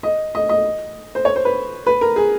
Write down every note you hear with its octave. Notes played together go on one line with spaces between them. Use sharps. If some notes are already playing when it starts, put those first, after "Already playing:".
D#5
D#5
D#5
C5
C#5
C5
B4
B4
A#4
G#4